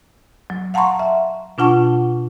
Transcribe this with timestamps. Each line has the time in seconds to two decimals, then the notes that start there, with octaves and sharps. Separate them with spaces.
0.50 F#3
0.74 F5 F#5 A5 A#5 C6 C#6
0.99 E5
1.58 B2 D4 F4 F#5 A5 C#6